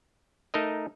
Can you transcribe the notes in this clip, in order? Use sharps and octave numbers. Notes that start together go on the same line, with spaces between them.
A3 D#4 A#4 D#5